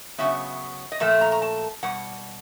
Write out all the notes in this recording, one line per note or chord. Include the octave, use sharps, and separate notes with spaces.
C#3 F#3 B3 E5
D#5
A#2 F3 A3 E5
A#5
A#5
A5
B2 G3 F#5